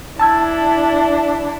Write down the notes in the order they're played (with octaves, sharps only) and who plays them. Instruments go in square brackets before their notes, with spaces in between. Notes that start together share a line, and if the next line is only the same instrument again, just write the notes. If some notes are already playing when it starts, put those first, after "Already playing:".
[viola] D4 [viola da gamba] E4 [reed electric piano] A5 E6 G#6